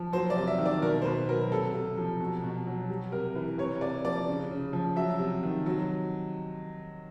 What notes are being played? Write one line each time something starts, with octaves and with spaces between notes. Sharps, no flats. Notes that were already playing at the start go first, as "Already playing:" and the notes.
Already playing: F3
F#3 C5
D5
C3
E5
D#3
D5
B2 A#4
C5
B2 B4
F#3 A#4
C3 A4
C3
F3
B2
B2
F#3
G3
C3 A#4
E3 B4
C3 C#5
C3 D5
F3 D5
C#3
C#3
F3
F#3 E5
C3
D#3
F#3